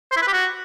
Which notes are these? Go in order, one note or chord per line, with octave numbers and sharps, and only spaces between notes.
C5
E4
B4
G4
F#4